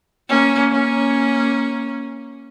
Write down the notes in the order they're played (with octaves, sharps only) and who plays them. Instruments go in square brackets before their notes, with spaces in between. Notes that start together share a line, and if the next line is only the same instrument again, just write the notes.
[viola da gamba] A#3 C#4
A#3 C#4